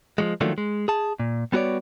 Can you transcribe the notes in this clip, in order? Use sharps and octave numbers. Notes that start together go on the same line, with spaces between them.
F3 F#3 G#3
D#3 F3 F#3 A3 A#3 D4
G#3
G#4 A5
A#2
G3 B3 F#4 G#4 C#5 D5